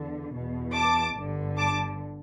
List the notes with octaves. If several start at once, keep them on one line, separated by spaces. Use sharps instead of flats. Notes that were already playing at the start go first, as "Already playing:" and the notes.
Already playing: E2 D3
E2 B2
A5 D6
G1 G2 D3
A5 D6